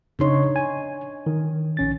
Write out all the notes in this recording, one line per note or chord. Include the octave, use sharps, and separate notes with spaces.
C#3 D4 D#4 C#5 C6
G#5
D#3
A#1 C#4 A6